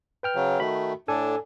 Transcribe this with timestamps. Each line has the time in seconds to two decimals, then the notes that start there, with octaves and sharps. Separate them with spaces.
0.23 B4 G5 F6
0.35 C#3 F#3
0.60 D#3 A3 F#4 B5
1.08 A2 D4 A4 G#5